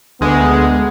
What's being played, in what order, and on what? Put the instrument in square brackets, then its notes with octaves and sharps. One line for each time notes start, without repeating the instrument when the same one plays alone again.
[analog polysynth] D2 G#3 [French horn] B3